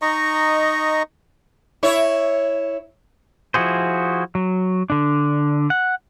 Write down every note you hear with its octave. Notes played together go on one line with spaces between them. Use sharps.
D#4 D#5 A#5 C#6
E4 C#5
F3 E4 F#4 G#4 C5
F#3
D3 D4
F#5